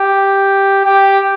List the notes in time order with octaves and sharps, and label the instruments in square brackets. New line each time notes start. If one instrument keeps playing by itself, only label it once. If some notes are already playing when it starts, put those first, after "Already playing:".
Already playing: [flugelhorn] G4
G4